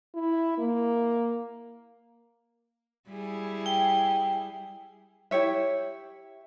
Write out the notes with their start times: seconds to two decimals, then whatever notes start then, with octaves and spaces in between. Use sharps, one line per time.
0.15 E4
0.58 A#3
3.09 G3 E4 G#4
3.66 G5
5.31 E4 G4 C#5 E5